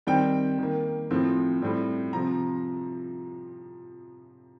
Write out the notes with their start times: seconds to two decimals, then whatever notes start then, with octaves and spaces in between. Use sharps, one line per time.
0.07 D#3 G3 C4 G5
0.58 D#3 A#3
1.11 A2 F3 C4
1.62 A2 G3 C4
2.13 C3 F3 C4 A#5